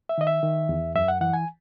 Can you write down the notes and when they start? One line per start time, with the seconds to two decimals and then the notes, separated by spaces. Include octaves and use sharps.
0.09 E5
0.18 D#3 D#5
0.27 E5
0.43 D#3
0.69 E2
0.95 F#2 E5
1.08 F#5
1.21 E3 F#5
1.33 G#5